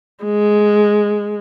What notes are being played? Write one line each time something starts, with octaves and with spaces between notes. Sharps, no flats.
G#3